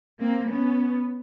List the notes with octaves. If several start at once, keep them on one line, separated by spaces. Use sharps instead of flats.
A#3 C4
B3 C#4